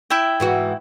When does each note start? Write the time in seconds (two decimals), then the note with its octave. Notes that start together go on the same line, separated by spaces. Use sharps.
0.10 E4 E5 G5
0.40 G#2 E3 F#4